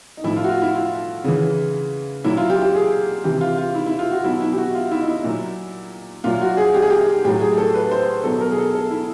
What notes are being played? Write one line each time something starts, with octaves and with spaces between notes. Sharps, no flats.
D#4
A2 F3 E4
F4
F#4
F4
E4
F4
C#3 E3
A#2 F#3 E4
F4
G4
G4
G#4
C3 E3 G4
F4
F4
E4
E4
F4
F#4
B2 F#3 E4
E4
G4
F#4
F4
E4
D#4
E4
A#2 F#3
A#2 F#3 F4
F#4
G#4
G4
G#4
G4
A2 F#3 G4
G#4
A4
B4
C5
B2 F#3 A4
A#4
G#4
A4
A4
E4